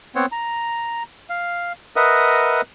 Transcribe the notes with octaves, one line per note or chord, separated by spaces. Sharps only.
B3 C4 C5 C#5 F#5
A#5
F5
A#4 B4 D#5 E5 F#5 D#6